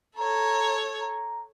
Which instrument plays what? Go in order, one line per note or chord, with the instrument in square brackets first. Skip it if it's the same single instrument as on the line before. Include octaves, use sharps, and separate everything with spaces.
[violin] A4 C#5 [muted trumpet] A#5
[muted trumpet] A#5